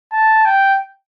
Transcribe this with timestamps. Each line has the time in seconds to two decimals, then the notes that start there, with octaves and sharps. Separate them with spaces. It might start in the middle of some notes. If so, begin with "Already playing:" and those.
0.13 A5
0.45 G5